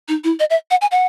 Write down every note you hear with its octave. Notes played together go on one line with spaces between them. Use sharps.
D#4
E4
D#5
E5
F#5
G#5
F#5